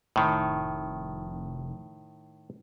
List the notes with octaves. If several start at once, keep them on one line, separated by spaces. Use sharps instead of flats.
F1 A2 D#3